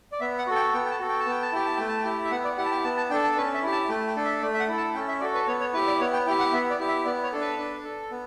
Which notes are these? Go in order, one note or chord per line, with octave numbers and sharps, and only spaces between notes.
D5
B3 E5
F#5
F#4 A4
G5
B3 G5
G5
A5
F#4 A4
G5
A5
B3
G5
A5
E4 G4 G5
A5
A3 G5
A5
G5
E4 G4
E5
B3 F#5
D5
E4 G4 F#5
A5
G5
B3 A5
A5
D4 A4 G5
A5
C#4 B4
E5
E4 G4
A5
A3 G5
G5
D4 A4
E5
A3 D5
E5
F#5
E4 A4
A5
C#4 G5
E5
F#4 A4 D5
B4
B3 C#5
C#5
E4 G4 B4
D5
B3 C#5
G5
E4 G4 G5
F#5
B3 E5
D5
E4 G4
E5
B3 D5
C#5
D4 A4
B4
D4
A4
B3